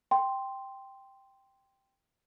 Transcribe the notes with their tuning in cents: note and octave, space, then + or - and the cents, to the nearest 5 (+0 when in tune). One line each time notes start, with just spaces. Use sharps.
G5 +0 C6 +0